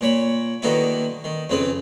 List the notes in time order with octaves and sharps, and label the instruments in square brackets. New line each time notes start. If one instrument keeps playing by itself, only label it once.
[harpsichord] A#2 C#5 B5
D3 D#3 A#3 B3 E4 F#4
D#3
F2 C#3 C4 B4 D#6